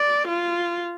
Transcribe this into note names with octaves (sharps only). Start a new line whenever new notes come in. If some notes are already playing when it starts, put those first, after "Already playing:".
Already playing: D5
F4